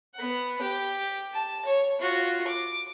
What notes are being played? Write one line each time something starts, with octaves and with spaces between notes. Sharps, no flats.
B3 F#5
G4
A5
C#5
F4 F#4
D6